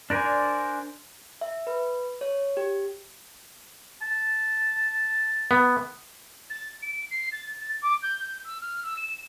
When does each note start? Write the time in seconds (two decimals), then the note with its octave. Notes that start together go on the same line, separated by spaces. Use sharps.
0.10 D4 A#4 C5 D5 G#5
1.41 E5
1.67 B4
2.21 C#5
2.57 G4
4.02 A5
5.51 B3
6.50 A6
6.82 D7
7.11 C7
7.32 A6
7.60 A6
7.82 D6
8.02 G6
8.19 G6
8.44 E6
8.61 F6
8.83 E6
8.97 E7